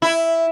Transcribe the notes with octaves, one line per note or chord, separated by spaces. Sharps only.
E4